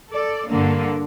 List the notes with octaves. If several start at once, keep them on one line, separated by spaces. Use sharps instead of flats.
A4 D5
G2 D3 A#3 D4